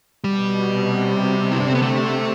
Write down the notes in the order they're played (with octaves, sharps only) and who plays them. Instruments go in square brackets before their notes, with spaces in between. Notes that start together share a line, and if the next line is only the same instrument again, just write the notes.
[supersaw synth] B2 [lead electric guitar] G3
[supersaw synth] C3
C3
D3
[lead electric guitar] E4
D4
C4
B3
[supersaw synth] C3 [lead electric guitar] A3